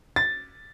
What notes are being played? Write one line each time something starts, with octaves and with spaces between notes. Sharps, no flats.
A6